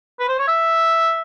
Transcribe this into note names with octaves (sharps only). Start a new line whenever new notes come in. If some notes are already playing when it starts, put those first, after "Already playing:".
B4
C5
C#5
E5